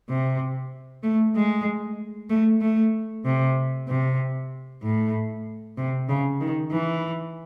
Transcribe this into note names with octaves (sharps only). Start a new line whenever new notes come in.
C3
A3
G#3
A3
A3
C3
C3
A2
C3
C#3
D#3
E3